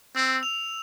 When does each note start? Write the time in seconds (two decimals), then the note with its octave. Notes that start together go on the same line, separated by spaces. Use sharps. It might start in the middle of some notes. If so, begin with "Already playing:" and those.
0.16 C4 E6
0.43 F7